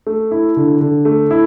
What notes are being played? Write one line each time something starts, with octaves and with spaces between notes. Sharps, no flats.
A3
E4
D3
D3
A3
E4